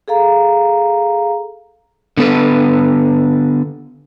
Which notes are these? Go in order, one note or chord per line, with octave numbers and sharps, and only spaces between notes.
G#4 A4 F5 A#5
D3 B3 A4 B4